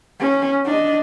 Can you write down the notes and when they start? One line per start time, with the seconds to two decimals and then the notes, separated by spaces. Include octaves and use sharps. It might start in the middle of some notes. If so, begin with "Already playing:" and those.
0.20 C#4
0.66 D4 D#5